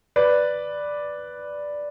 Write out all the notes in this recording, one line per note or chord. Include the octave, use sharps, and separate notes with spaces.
B4 D5